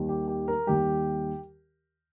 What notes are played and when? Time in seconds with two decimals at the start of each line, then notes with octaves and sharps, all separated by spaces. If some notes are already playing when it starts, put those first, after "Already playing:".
Already playing: D#2 D#3 G3
0.09 G4
0.28 G4
0.48 A#4
0.67 D#2 D#3 G3 G4